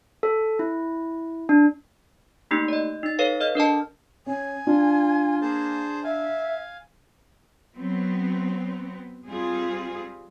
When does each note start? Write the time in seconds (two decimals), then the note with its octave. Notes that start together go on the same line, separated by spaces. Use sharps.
0.23 A4
0.59 E4
1.49 D4
2.51 A3 A#3 D#4 G4
2.68 D5 D#5
3.03 D#4 A6
3.19 A4 B4 C#5 F5
3.40 A4 D#5 F6
3.55 D4 A#4 D#5 A5
4.26 C#4 G#5
4.67 D4 F4
5.41 A#3 G#4 C5 A5
6.04 E5 F5 G#5
7.75 F#3 B3 C4
9.27 G3 C4 F4 G#4